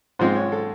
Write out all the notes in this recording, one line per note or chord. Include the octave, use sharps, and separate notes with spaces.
G#2 F3 G#3 C4 C5
C#5
A4